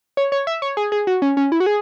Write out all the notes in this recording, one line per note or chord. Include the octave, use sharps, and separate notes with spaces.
C#5
C#5
E5
C#5
G#4
G#4
F#4
C#4
C#4
E4
F#4
G#4